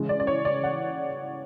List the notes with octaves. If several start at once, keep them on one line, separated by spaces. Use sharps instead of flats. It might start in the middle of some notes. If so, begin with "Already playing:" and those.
Already playing: C#3 E3 G#3
D5
D5
C#5
D5
F#5